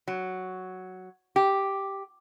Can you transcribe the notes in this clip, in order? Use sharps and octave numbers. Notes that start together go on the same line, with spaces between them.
F#3
G4